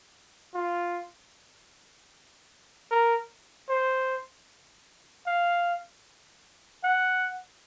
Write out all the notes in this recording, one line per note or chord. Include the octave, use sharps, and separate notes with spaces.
F4
A#4
C5
F5
F#5